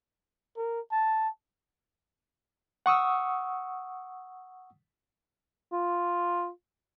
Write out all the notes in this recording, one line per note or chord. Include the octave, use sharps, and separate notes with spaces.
A#4
A5
F#5 C#6 D#6 E6
F4